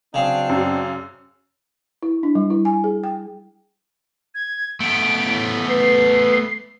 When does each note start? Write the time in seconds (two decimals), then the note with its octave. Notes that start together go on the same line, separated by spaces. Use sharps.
0.14 C#3 F#3 C4 D4
0.49 F#2
2.03 E4
2.23 D4
2.35 G3
2.50 E4
2.65 G#5
2.84 G#4
3.04 G5
4.35 G#6
4.80 A3 B3 D7
5.23 A2
5.69 B4 C7